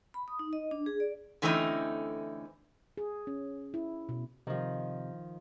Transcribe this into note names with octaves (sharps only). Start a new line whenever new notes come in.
B5
D#6
D#4
D#5
D4
G#4
D5
D3 E3 A3 C4 C#4 D#4
G#4
C#4
E4
B2
C3 D#3 F3